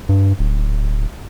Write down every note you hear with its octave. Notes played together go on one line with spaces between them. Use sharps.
G2
D1